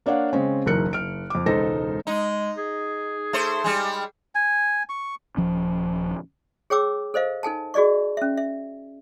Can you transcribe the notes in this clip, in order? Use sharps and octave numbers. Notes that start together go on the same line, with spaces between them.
A#3 D4 C#5 D5 F5 F#5
C#3 G#3 C4 C#4
F#1 B1 E2 A#4 F#6 C#7
F#1 F6 D7
F2 D6
E1 C#2 D#4 A4 C5 A#6
G#3 D#4
G#4
A3 C5
G3 G#3
G#5
C#6
D#1 F3 C#4
G#4 C#5 G5 D6 E6
A4 C5 D#5 F5
D#4 A4 G#5 A5
F#4 G#4 D5 D#5 C#6
C#4 E5
E5